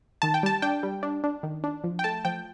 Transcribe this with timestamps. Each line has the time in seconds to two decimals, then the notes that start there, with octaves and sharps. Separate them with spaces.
0.22 D#3 A5
0.34 G5
0.43 G3 A5
0.62 D4 G5
0.83 G3
1.03 D4
1.24 D4
1.43 D#3
1.64 D4
1.84 F3
1.99 G5
2.04 A3 A5
2.25 F3 G5